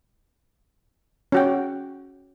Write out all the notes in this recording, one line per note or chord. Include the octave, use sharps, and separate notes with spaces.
C#4 F#4 G5